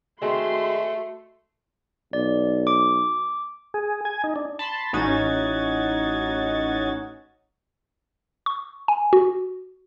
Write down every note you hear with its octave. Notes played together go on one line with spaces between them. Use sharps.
D#3 G#3 A3 C4 F#4 C6
B1 D5
D6
G#4
G#5
D#4
D4
A5 B5 C6
A1 C#4 D#4 F#4 G#6 A6
C#6
G#5
F#4